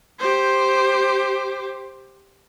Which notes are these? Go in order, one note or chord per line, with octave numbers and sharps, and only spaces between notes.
G4 C5